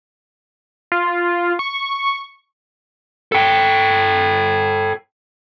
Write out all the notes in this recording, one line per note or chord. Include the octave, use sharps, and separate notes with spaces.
F4
C#6
A4 G5